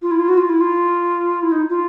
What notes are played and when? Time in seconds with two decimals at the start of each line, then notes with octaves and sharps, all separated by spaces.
0.02 F4
0.11 E4
0.19 F4
0.28 F#4
0.37 F4
0.49 E4
0.61 F4
1.42 E4
1.52 D#4
1.70 F4